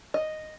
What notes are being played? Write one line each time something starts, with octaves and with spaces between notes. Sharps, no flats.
D#5